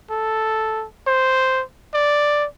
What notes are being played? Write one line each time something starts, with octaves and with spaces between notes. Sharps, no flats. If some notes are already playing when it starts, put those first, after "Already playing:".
A4
C5
D5